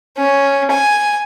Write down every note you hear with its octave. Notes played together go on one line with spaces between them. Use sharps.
C#4
G#5